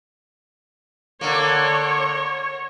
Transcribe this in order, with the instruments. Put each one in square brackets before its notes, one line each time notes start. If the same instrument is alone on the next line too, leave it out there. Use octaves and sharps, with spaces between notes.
[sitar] D3 A#3 [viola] C#5